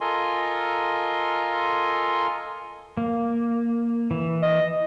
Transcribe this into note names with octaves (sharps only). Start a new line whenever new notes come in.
F4 A4 A#4 D#5 G#5 C6
A#3
E3
D#5